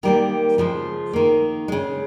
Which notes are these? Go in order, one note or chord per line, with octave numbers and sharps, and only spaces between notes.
D#3 G3 A#3 A#4
C#3 F3 G#3
D#3 A#3
C#3 G#3